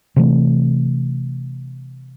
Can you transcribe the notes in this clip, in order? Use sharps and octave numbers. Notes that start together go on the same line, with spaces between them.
C3 E3 A3